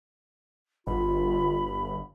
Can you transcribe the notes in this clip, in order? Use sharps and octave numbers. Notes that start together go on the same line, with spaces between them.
G1 F4 B5